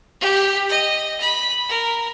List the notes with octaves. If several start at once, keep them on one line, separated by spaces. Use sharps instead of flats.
G4
D#5
B5
A#4